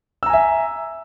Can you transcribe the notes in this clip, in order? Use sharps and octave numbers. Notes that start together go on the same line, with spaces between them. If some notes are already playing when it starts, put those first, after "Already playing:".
E5 G#5 A#5 E6